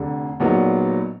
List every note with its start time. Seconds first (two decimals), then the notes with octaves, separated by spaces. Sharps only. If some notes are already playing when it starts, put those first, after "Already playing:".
Already playing: F1 D3
0.40 A#1 A#2 F#3 B3 D#4